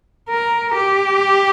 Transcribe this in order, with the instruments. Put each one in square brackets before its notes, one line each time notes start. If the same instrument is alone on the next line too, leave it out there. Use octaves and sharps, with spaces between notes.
[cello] A#4
G4